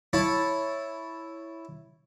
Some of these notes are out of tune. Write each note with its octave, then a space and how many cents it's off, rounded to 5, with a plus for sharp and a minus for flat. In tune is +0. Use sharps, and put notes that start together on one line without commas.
E4 +0 C#5 +0 A5 +0